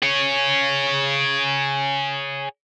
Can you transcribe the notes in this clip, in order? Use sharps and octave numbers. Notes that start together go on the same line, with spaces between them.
G#4 C#5